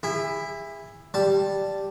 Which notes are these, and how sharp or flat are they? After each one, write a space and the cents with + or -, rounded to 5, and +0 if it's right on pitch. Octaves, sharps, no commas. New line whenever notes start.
E4 +5 G#4 -35
G3 +0 A5 +0